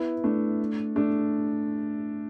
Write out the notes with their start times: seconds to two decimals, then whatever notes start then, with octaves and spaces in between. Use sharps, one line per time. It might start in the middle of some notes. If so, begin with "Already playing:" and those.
Already playing: B3 E4
0.24 A3 D4
0.96 A3 D4